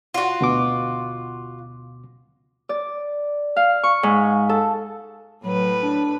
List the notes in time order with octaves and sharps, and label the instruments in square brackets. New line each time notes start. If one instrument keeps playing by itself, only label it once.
[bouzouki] F4 F#4
[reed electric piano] D2 B2 D6
[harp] D5
F5
C#6
G#2
A4
[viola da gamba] A2 B4 [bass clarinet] F#3
[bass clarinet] D4